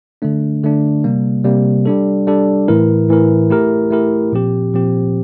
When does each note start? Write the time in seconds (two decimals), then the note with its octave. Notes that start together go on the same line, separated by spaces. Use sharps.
0.22 D3 A3 D4
0.63 D3 A3 D4
1.04 C3 G3 A#3
1.44 C3 G3 A#3
1.86 G3 D4 A4
2.27 G3 D4 A4
2.68 A2 E3 A3 E4 A#4
3.09 A2 E3 A3 E4 A#4
3.50 A3 E4 G4 A#4
3.91 A3 E4 G4 A#4
4.32 A#2 F3 C4 G4
4.74 A#2 F3 C4 G4